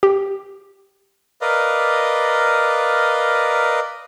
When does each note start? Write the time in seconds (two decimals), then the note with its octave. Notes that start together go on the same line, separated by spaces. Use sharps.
0.03 G4
1.41 A#4 B4 D5 D#5 F5